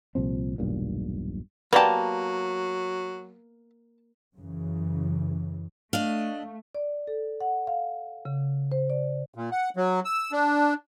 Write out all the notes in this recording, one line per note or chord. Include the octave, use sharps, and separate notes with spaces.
C2 A#2 F3 C4
E1 B1 G2 A#2
F#3 A#3 B3 G4 D5 A5
F#2 C#3 E3
A3 D4 D#5 F5
D5
A4
F#5
F5
C#3
C5
D5
A#2
F#5
F#3
E6
D4